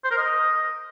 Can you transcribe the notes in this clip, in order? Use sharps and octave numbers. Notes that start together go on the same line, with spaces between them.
C5
A#4
D#5